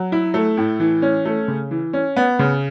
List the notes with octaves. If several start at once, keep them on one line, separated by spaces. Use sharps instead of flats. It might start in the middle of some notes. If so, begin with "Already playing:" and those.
Already playing: F#3
E4
A3
A2
E3
C#4
A3
C#3
E3
C#4
B3
C#3